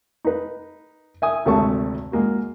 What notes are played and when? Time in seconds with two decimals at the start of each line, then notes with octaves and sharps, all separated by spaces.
0.25 D#4 B4
1.22 E5 G#5 D#6
1.45 G#1 D2 C3 A3 A5 C#6
2.12 G#3 A#3 F#4